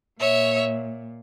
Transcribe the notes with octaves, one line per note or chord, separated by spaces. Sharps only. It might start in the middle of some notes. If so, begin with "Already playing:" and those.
A#2 C#5 E5